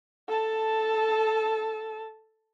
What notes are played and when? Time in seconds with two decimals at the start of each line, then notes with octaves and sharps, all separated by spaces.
0.28 A4 A5